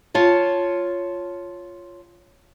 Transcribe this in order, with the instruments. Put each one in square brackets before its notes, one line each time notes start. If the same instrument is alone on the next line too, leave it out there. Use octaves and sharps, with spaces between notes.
[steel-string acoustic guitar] F4 C#5 A5